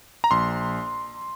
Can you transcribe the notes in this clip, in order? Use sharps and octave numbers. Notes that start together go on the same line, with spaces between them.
A#5
A#1 C6